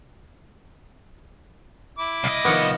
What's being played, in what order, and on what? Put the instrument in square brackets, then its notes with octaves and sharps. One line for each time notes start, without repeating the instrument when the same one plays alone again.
[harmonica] E4 D6
[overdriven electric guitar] C2 D#5
[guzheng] D#3 F3 C#5 [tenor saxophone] B3